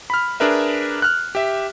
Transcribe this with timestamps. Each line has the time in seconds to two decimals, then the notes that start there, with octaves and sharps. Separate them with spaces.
0.10 B5 F6
0.40 D4 G#4 A#4 B4 E5
1.02 F6 F#6
1.35 G4 E5